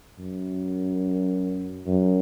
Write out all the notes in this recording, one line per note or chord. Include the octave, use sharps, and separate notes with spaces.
F#2
F#2